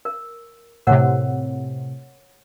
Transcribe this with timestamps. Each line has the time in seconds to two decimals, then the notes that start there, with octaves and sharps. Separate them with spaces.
0.05 A#4
0.87 A2 C3 A#4 C#5 F#5